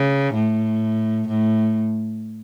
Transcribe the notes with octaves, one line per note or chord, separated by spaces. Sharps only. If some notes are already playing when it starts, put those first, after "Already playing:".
Already playing: C#3
A2
A2